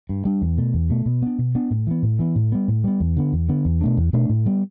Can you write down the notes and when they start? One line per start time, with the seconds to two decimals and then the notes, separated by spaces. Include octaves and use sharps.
0.09 G2
0.25 G3 D4
0.42 E2
0.58 B2 A3
0.74 E2
0.90 B2 A3
1.06 B2
1.22 B3 D4
1.39 B2
1.55 B3 D4
1.71 A2
1.87 E3 B3
2.03 A2
2.19 E3 B3
2.36 A2
2.52 G3 B3
2.68 A2
2.84 G3 B3
3.00 E2
3.17 D3 B3
3.33 E2
3.49 D3 B3
3.65 E2
3.81 B2 A3 D4
3.97 E2
4.13 B2 A3 D4
4.29 A2
4.46 G3 B3